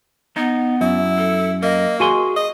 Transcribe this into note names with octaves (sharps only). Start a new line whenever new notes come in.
B3 D#4
F#2 E4
A4
A#3 D#5
F#4 G#4 G#5 C6
D#5